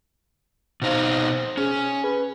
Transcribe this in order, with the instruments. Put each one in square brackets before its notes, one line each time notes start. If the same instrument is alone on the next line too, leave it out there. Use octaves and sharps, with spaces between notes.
[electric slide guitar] B2 D#4 F5 [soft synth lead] C5
[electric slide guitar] C#4 [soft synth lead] G#4
[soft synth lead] B4